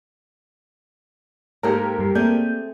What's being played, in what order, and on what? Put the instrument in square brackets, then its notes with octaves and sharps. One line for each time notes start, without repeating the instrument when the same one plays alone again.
[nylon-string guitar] G#2 A#3 [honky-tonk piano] G4 A4 A#4
[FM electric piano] G2 G3
[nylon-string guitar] A3 C4 G#4 [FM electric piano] A#3 D5 G6